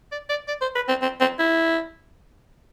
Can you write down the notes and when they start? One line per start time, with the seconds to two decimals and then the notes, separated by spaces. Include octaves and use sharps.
0.12 D5
0.30 D5
0.48 D5
0.62 C5
0.75 B4
0.89 C4
1.02 C4
1.21 C4
1.39 E4